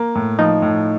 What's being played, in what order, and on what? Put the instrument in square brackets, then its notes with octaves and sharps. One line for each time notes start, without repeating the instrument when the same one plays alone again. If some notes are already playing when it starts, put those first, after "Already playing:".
Already playing: [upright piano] A#3
A2
[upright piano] F3 [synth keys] D#4
[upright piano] A2